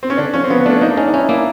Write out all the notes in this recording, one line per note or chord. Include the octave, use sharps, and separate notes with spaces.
C4
C#4
D3 D4
F3 C#4
C4
F3 B3
A3 D4
A#3 D#4
D4
C#4 D#4
D#4
C#4 E4
A#3 E4